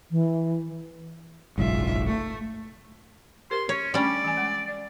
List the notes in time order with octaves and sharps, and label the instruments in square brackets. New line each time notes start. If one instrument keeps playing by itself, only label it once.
[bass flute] E3
[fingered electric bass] F#1 B1 G#2 [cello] F4 E5
[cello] A3
[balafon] G4 A#4 C5 [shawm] C6
[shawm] C#4 [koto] C#5
[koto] G3 C#4 [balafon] A3 D4 [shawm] D5
[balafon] E3 G#5
G#3
D5